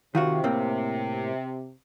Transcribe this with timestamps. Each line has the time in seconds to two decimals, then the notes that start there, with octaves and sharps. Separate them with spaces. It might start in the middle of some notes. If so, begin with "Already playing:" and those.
0.15 C3 D#3 F4 F#4
0.44 A2 A#3 C4